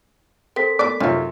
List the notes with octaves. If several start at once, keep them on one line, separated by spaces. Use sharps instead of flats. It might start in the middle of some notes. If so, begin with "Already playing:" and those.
C4 A4 A#4 B6
B3 D5 D6
F#2 C3 C#4 D#4 F4